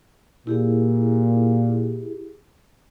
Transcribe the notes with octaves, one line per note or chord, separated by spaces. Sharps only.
A#2 E4 G4 G#4